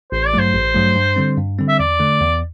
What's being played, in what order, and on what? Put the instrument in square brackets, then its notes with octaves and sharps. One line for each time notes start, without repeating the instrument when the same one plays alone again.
[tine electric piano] A1 [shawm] C5
[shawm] D5
[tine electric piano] G2 F#3 A3 [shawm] C5
[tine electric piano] A1
G2 F#3 A3
G2
D3 G3 C4
G2
D3 G3 C4
[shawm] E5
[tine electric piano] E2 [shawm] D5
[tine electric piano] D3 A3
E2